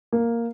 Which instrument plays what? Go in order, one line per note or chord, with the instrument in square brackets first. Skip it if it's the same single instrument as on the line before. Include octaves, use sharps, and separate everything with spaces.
[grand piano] A#3